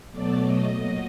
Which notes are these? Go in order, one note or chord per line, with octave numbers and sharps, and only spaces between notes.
B2 F#3 A3 D5
D#5
A#2 F#3